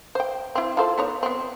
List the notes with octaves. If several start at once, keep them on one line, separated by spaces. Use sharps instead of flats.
C5 G5
C4 E4
F4 A4 C5
B3 D#4 C#5
B3 C4